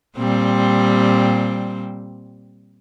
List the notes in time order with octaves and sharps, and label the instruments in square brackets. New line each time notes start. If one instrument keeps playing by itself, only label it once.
[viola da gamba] A#2 G3 C4